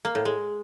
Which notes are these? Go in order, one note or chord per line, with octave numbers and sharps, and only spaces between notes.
A#3
A2
G#3